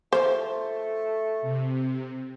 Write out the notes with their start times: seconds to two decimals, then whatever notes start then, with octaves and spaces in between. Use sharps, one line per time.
0.13 F3 A3 F4 C5
1.42 C3